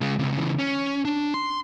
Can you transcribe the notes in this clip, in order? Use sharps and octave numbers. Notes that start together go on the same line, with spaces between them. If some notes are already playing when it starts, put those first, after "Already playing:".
C#3 G#3
C#2 C3
C#3 E3
C#4
D4
C6